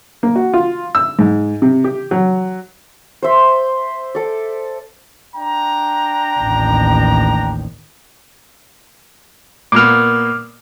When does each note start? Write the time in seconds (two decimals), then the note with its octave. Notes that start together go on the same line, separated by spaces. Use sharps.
0.23 A#3
0.36 F#4
0.54 F4
0.95 E6
1.19 G#2
1.62 C3
1.84 G4
2.11 F#3
3.23 C5 E5
4.15 A4 D5
5.34 D4 G5 A#5
6.39 A1 D#2
9.72 A#2 A#3 B3 D6 F6